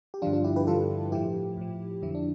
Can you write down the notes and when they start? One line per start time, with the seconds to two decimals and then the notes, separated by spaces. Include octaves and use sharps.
0.14 G4
0.22 G2 D3 F3 D4 F4
0.33 D4 F4
0.44 E4 G4
0.56 G4 B4
0.67 G2 D3 F3 F4 A4
1.12 A2 F3 E4 G4
1.57 A2 F3
2.02 F2 D3 F3 E4
2.15 D4